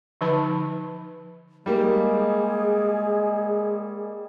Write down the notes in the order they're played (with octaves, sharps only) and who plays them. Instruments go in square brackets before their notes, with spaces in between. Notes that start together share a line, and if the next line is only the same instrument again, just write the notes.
[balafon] D3 F3 D#4 B4 A5 B5
[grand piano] G3 A#3 [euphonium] G#3 [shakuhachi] G#4